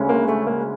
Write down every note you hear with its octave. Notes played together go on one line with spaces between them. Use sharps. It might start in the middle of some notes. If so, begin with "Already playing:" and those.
Already playing: D2 C#3 G#3 C#4
A#3
A3
A#3